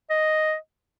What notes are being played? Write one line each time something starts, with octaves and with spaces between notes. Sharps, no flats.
D#5